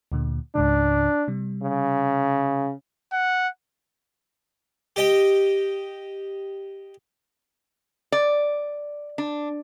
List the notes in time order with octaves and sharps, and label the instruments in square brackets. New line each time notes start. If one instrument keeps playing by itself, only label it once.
[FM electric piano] D2 A#2 D3
[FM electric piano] C#2 G#2 C#3 [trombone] D4
[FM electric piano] C3 G3
[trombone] C#3
[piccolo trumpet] F#5
[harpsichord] G4 D#5 G5
[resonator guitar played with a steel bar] D5
D4